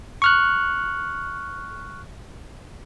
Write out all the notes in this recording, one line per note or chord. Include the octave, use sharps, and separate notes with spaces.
C#6 F6 F#6